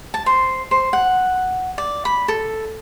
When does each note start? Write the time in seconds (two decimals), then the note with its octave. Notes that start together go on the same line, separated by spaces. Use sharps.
0.14 A5
0.26 C5
0.71 C5
0.93 F#5
1.78 D5
2.05 B5
2.28 A4